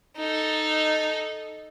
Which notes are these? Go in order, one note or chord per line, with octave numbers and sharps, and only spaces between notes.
D#4 A4